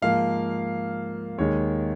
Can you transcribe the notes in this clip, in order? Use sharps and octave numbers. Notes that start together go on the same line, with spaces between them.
G#2 F3 A#3 F5
D#2 D#3 G#3 C#5